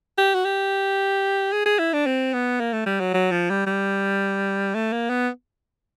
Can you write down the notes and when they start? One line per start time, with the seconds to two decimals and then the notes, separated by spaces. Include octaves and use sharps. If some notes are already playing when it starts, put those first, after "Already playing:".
0.18 G4
0.35 F#4
0.45 G4
1.52 G#4
1.66 G#4
1.79 E4
1.93 D4
2.06 C4
2.33 B3
2.60 A#3
2.73 A3
2.86 G3
3.00 F#3
3.14 F#3
3.31 F3
3.50 G3
3.67 G3
4.75 A3
4.92 A#3
5.10 B3